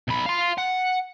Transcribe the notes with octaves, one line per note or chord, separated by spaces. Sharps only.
B1 B5
F5 C6
F#5